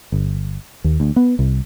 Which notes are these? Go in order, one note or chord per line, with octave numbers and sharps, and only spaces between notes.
G1
D#2
D2
B3
C2